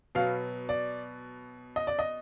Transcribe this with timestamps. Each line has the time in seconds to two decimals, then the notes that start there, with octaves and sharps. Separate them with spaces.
0.15 B2 F#3 B3 F5
0.69 D5
1.76 D#5
1.87 D5
1.99 D#5